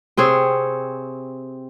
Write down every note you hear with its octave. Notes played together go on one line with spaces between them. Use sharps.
C3 C4 G#4 C#5